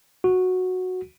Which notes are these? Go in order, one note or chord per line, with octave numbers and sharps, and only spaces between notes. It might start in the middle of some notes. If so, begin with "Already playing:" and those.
F#4